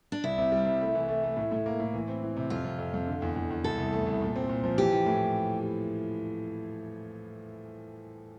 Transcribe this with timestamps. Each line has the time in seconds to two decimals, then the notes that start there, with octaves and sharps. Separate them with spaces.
0.12 D4
0.24 C2 E4
0.38 C3
0.52 G3
0.66 C2
0.81 A3
0.95 E3
1.09 A3
1.24 A3
1.37 A2
1.51 A2
1.66 A#3
1.80 A2
1.94 E3
2.08 C4
2.23 E3
2.37 C3
2.50 F2 F4
2.65 F2
2.79 F2
2.94 F2
3.07 D3
3.22 E2
3.36 E2
3.50 E2
3.64 C2 A4
3.78 C2
3.93 A3
4.07 C2
4.22 A#2
4.36 C4
4.49 A#2
4.64 F3
4.78 E3 G4
4.93 E3
5.06 A2